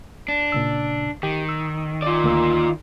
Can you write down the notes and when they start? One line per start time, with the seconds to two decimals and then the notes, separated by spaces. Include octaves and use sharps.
0.28 D4
0.52 A#2 C#3 E6
1.23 D#3 G4
1.49 E6
2.02 F4 D5
2.24 D2 A#3 E6